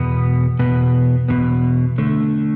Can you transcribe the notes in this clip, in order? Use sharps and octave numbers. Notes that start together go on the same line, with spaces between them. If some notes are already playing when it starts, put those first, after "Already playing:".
Already playing: E2 B2 B3
E2 B2 B3
E2 B2 B3
D3 A3